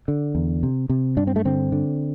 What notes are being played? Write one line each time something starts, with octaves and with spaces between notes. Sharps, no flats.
D3
E2
C3
C3
G2 D4
C4
A3
D3 C4
D3